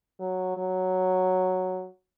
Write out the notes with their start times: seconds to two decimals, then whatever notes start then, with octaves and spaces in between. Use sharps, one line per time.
0.20 F#3
0.57 F#3